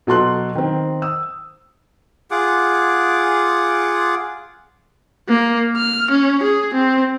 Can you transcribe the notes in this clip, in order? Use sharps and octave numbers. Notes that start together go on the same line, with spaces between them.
B2 F#3 A4 C6 F#6
D#3 C4
D#6 E6
F4 G#4 F#5 D6
A#3
F6
C#4
G#4
C4